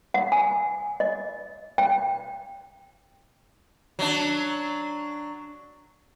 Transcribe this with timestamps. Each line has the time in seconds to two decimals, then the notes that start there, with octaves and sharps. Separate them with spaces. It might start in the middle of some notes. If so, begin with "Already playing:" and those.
0.14 F#5
0.32 G#5
1.00 D#5
1.78 G5
3.99 F#3 D4